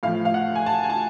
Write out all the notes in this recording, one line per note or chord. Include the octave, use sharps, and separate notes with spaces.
A2 F3 F5
F5
F#5
G#5
A5
G#5
A5